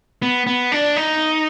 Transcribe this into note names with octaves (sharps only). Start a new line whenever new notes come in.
B3
B3
D4
D#4